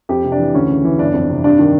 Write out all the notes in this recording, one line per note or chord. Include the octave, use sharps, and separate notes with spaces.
F2 G4
C3
D4
E3
D2 C#4
C#3
E3
G1 D4
F2
C3
G2 D4
D#3